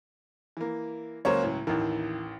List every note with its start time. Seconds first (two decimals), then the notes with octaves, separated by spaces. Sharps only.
0.57 E3 A#3
1.25 C#2 F#3 A#3 C#4 C5 C#5
1.44 A2
1.67 A1 D#2 D#3 E3